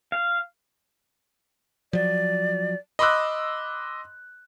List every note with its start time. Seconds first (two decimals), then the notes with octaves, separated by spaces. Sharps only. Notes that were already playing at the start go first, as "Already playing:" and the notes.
0.12 F5
1.93 F3 F#3 D5
2.99 D#5 B5 C6 D6 E6 F#6